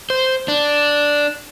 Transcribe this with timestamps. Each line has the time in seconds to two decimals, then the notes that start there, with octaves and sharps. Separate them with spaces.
0.10 C5
0.48 D4